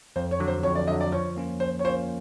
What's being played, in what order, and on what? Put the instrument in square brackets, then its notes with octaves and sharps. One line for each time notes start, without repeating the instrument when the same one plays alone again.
[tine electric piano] F2 [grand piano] C5
[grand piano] C#5
[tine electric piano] D3 F#3
[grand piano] C5
[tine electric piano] F2 [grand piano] C#5
[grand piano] D5
[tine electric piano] D3 [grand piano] D#5
[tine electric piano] F#3
[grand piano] D5
[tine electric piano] F3 [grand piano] C#5
[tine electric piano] A#3 C#4 F4
[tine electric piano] F3 [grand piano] C5
[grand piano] C#5
[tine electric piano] A#3 C#4 F4 [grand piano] C5